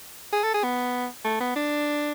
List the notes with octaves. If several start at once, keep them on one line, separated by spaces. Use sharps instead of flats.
G#4
A4
G#4
B3
A3
B3
D4